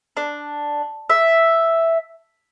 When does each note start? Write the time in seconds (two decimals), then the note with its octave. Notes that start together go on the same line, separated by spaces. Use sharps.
0.17 D4
1.10 E5